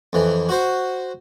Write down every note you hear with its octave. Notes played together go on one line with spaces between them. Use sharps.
F2 E3
F#4 C5